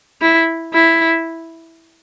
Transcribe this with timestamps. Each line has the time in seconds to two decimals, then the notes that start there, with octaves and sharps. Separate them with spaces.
0.21 E4
0.74 E4